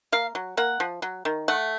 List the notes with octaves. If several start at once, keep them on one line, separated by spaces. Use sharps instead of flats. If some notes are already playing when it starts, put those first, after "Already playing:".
A#3 F5
F#3
A#3 F#5
F3
F#3
D#3
A3 F#5